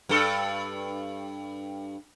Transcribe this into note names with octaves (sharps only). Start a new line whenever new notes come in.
G2 A4